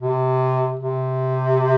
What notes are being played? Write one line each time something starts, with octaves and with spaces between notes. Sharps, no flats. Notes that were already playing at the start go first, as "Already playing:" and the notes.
C3
C3